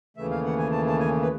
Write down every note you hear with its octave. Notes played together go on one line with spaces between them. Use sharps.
D#2 C#3 E3 A3 E5
F5
F#5
G#5
A5
A5
G#5
B4